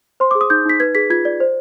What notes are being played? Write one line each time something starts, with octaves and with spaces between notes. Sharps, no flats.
C5 C6
D6
G#4
D#6
D#4 G6
D#4 B6
B4 G#6
G#4 B6
F4 G#6
D5
C5